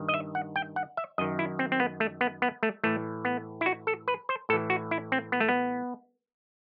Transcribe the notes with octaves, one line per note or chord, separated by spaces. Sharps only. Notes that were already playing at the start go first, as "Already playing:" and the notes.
Already playing: G2 D#3
D#5
E5
F#5
G5
F#5
E5
F#2 D#3 D#5
E4
C4
C4
B3
A3
B3
B3
A3
A2 E3 A3
B3
E4
F#4
A4
B4
C5
A2 E3 A4
F#4
E4
C4
B3
A3
B3